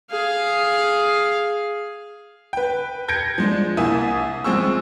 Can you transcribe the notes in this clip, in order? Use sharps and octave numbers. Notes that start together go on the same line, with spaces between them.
G#4 F5
B4 G5
G6 G#6 A#6 C#7 D7
F3 G#3 D4
C2 A#3 E4 E5 G#5 D#6
F3 G#3 C4 G#4 C#6 E6